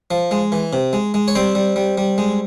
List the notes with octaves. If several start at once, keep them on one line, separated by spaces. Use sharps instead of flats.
F3
G#3
E3
C3
G#3
G#3
C#5
G3 C4 C5
G3
G3
G3
G#3